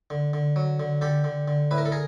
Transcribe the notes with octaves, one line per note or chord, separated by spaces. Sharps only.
D3
D3
F#3
D3
D3 G4 A4
D3
D3
A2 B4
A#4
A4
G#4 A#4